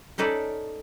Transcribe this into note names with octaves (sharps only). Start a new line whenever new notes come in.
C#4 D#4 A4 B4 D5